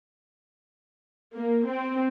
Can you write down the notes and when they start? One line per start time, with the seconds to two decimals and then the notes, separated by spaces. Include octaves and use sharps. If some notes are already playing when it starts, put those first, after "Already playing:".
1.36 A#3
1.69 C4